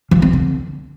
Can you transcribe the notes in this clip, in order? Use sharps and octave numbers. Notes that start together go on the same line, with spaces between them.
F3
C4
D3